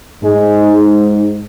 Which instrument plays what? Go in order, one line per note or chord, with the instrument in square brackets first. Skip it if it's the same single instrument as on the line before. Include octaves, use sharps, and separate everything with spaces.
[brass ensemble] G#2 G#3